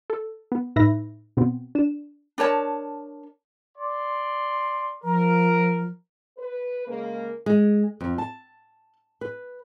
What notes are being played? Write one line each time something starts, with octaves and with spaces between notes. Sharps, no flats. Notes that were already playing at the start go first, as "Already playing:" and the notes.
A4
B3
A2 D#4 B4 E5 B5 A#6
B2 B3 C4
D4 E7
D4 A#4 C#5 A5
D5 C6
F3 A#4
B4
C#3 G#3 A#3
G#3
F2
A5
B4